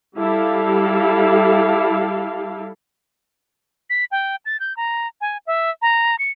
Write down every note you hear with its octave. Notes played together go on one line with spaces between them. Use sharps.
G3 E4 G4 A4 F5
B6
G5
A6
G6
A#5
G#5
E5
A#5
C#7